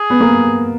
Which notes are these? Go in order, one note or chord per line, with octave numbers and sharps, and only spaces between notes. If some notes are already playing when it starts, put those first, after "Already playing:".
Already playing: G#4
B3
A#3